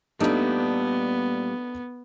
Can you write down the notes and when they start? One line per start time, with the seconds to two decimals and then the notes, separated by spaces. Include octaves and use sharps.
0.20 A#2 G3 A3 B3 D4 D#4